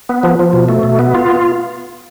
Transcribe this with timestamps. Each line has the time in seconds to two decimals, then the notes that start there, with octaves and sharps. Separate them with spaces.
0.09 B3
0.23 F3
0.39 F3
0.53 B2
0.69 A3
0.83 B2
0.99 B3
1.15 F4